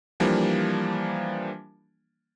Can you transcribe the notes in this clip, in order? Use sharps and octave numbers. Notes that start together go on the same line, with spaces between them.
E3 F3 G3 A#3 D4